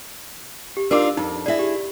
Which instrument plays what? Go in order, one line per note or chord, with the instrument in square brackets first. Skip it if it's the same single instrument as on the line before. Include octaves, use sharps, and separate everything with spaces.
[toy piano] G4
[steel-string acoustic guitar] D4 D#4 F4 [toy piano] A#4 D6 E6
[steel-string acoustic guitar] F2 [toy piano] D#4
[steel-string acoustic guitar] E4 G#4 [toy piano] D5 E5
[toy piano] G4